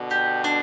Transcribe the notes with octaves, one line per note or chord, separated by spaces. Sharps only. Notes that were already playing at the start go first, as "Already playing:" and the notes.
Already playing: B2 D3
G4
D4